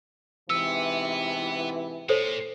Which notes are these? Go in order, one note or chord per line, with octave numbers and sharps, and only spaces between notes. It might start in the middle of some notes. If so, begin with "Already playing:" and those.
G#2 C3 E3 B3 E6
A#2 A4 C5 C#5